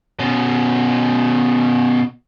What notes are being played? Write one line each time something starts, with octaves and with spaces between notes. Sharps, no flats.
B2 C#4